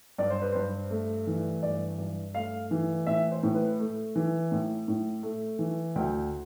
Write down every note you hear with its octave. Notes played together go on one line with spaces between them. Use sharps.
G2 D5
C5
B4
G2 C5
A3
E3
G2 D5
G2
A3 F5
E3
A2 E5
C5
A2
B4
A3
E3
A2
A2
A3
E3
D2 G5